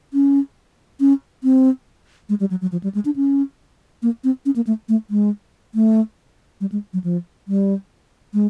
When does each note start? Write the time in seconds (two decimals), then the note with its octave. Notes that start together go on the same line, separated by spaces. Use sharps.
0.14 C#4
1.00 C#4
1.44 C4
2.29 G#3
2.40 G3
2.51 F#3
2.62 F#3
2.72 F3
2.83 G3
2.95 G#3
3.05 D4
3.16 C#4
4.02 A#3
4.24 C4
4.46 C#4
4.56 A#3
4.67 A3
4.89 A3
5.10 G#3
5.75 A3
6.61 G3
6.72 G#3
6.93 F#3
7.04 F3
7.48 G3
8.34 G#3